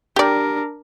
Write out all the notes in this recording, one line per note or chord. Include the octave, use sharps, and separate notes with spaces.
D4 G4 A#4 D5